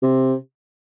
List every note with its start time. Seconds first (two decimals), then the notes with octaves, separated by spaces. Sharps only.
0.03 C3